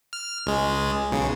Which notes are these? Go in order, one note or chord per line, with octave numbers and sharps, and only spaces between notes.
F6
C#2 G#3
B1 C#3